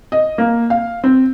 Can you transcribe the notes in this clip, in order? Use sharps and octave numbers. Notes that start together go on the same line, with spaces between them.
D#5
A#3
F5
C4